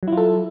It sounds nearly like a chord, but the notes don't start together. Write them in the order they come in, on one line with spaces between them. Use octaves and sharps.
F#3 E4 F4 A4